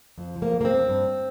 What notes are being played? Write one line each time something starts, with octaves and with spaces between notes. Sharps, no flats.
F2
F3
A#3
F2
A#3
C4
F2
G2